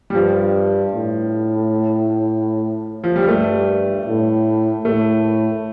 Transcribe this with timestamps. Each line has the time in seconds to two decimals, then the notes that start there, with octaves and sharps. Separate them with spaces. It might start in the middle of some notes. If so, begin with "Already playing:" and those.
0.10 G3
0.14 G2 F3
0.93 A2
3.04 F3
3.16 G3
3.28 G2 A3
4.07 A2
4.85 A2 A3